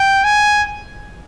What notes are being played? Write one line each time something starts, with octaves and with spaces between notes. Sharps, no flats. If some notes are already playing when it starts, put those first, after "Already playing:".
Already playing: G5
G#5